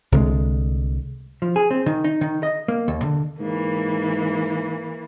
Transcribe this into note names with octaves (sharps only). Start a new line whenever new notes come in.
C2 D3 F#3 G#3
F3
G#4
C4
D#3
D#4
D#3
D#5
A#3
D#2
D3
G#2 E3 A#3